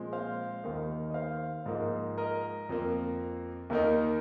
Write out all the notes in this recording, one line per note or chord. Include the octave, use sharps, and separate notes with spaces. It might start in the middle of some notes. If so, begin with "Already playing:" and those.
Already playing: A#2 F3 G#3 C4
C5 F5
D#2 D#3 A#3 D#4
D#5
C5 F5
G#2 F3 A#3 D#4
A#4 D#5
F2 F3 A#3
D#2 D#3 A#3 D#4 A#4